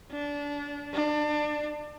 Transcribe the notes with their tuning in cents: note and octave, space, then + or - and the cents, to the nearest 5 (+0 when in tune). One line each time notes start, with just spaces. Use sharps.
D4 -25
D4 +25